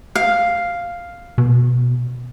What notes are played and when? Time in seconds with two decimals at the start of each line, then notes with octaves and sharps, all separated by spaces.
0.15 F5
1.38 B2